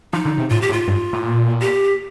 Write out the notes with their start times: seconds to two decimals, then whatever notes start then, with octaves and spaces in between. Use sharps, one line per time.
0.13 F3 D#4
0.25 D3
0.37 C3
0.50 A2 F4
0.62 G4
0.69 A2
0.73 F4
0.87 G2
1.13 A2
1.24 A#2
1.61 G4